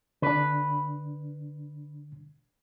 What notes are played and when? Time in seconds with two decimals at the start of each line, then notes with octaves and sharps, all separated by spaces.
0.22 D3 D4 B4